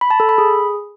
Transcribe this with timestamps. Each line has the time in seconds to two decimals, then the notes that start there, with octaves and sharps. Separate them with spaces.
0.01 B5
0.11 A5
0.20 A4
0.29 B5
0.38 G#4